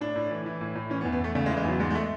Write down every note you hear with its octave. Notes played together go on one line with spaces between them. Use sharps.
A2 D4
A2
E3
E3
A2
A2
E3 C#4
B3
E2
B3
E2 A3
C#3 A3
G#3
E3
G#3
E2 F#3
G#2 G#3
G#3
A3